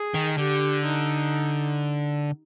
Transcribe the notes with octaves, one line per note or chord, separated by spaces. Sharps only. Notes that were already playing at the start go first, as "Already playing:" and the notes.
Already playing: G#4
D#3
D3 G4
D#4